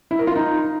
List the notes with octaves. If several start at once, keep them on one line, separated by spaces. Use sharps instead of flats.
E4
A#4
F4
D#4